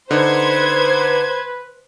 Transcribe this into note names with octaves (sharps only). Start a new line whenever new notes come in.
D3 D#4 B4 C5 G#6